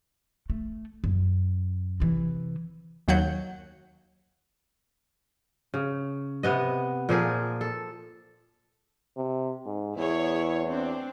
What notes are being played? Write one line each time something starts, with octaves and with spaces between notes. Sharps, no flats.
A3
F#2
C3 E3
D#2 F#3 F#5 G6
C#3
C3 B3 D#5
A#2 F3 G#4 A#4
A4
C3
G#2
E2 E4 G#4 C#5
C4 D4